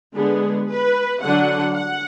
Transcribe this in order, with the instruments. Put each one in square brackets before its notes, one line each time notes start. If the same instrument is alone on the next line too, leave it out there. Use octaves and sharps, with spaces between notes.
[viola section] D3 G#3 B3 G#4
B4
D3 F#3 D4 F#5
F#5